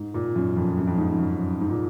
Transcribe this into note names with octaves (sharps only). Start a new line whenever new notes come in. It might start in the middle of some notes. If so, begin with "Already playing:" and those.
Already playing: G#2
A#2
F#2
F2
F#2
F2
G#2
G#2
F#2
G#2
A#2